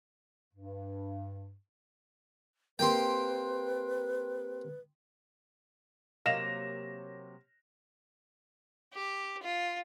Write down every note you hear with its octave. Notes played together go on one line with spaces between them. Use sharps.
G2
A#3 C4 G4 B4 G5 C6
C3 F#3 A#3 D#5 F5 A#6 E7 F7
G4
F4